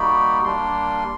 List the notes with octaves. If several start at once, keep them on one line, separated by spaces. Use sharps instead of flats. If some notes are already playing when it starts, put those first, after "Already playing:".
Already playing: G3 A#3 D#4 F#4 B5
G3 A#3 D4 C6